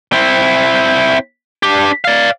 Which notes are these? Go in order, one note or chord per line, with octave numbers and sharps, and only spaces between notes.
C4 E4
D4 G4
D5 F5